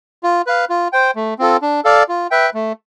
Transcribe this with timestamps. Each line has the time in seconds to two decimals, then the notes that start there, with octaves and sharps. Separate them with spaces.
0.23 F4
0.47 B4 F5
0.70 F4
0.93 C5 G5
1.16 A3
1.39 C4 F4 A4
1.62 D4
1.85 A4 D5 F5
2.09 F4
2.31 B4 E5 G5
2.54 A3